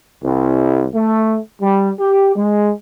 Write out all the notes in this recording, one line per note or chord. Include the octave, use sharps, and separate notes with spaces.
C2
A3
G3
G4
G#3